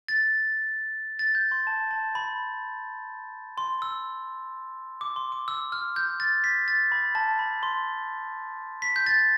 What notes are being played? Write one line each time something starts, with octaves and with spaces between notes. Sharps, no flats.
A6
A6
G6
C6
A5
A5
B5
C6
E6
D6
C6
D6
E6
F6
G6
A6
B6
A6
B5
A5
B5
C6
B6
G6
A6